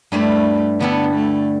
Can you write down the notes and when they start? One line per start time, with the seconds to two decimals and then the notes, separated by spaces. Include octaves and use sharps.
0.12 G2 G3 A3 E4 B4
0.80 D3 G3 B3 E4 A4
1.15 A3